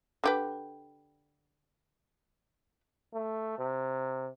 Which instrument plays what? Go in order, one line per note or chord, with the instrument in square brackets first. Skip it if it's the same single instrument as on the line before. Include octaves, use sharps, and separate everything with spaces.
[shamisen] D3 G4 B4
[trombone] A3
C3